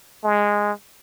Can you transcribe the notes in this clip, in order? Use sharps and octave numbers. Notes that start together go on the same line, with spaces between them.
G#3